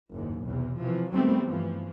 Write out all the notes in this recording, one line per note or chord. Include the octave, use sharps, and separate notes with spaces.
F#1 D#2 G#2
B1 E2 C3
C3 E3 F3
D#3 F#3 G3 A3 B3 C4
G2 E3 F3